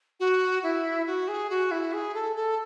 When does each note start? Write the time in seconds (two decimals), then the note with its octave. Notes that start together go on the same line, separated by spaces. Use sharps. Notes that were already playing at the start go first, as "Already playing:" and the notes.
0.20 F#4
0.63 E4
1.06 F#4
1.28 G#4
1.50 F#4
1.71 E4
1.93 G#4
2.15 A4
2.36 A4